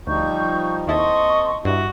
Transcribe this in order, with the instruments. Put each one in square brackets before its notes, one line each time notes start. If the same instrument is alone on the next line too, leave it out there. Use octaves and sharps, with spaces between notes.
[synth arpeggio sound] D2 [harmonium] F3 G3 D#4 [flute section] C#6 G6
[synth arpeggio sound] D#2 E4 A5 [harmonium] C4 A4 [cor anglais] D#5 [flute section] C6 C#6
[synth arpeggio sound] G2 [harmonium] E4 [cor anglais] F#4